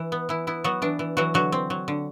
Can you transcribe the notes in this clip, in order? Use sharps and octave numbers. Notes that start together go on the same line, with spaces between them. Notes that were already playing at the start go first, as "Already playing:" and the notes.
Already playing: E3
B3
E3 E4
B3 E4
F#3 B3 F#4
E3 D4
E3
E3 F#3 F#4
D3 F#3 F#4
C4
F#3
D3